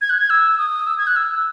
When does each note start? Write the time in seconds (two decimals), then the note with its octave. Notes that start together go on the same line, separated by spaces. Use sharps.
0.01 G#6
0.10 F#6
0.18 G#6
0.30 E6
0.58 D#6
0.87 E6
0.98 G#6
1.07 F#6
1.16 E6